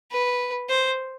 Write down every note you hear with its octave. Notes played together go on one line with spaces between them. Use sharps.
B4
C5